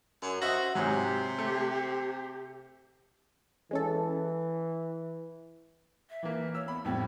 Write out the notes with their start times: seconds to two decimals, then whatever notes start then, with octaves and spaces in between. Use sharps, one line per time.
0.22 F#2
0.42 F#4 C5 D#5 E5 F#5
0.75 G#2 C3 F#3 G4
1.38 A3
3.71 E3 G#3 C#4 A4
6.10 E5
6.23 E3 A#3
6.55 C#5 E6
6.68 B3 B5
6.85 F2 A2 G3 B3